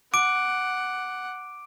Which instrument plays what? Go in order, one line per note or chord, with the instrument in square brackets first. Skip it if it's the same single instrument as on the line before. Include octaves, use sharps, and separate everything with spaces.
[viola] F#5 [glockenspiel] D6 D7